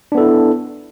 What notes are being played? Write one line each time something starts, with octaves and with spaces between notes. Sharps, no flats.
B3 D4 E4 A4